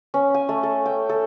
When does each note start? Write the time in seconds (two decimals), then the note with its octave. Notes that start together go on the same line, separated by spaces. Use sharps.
0.14 C#4
0.34 G#5
0.49 A3
0.63 A4
0.86 G5
1.09 A4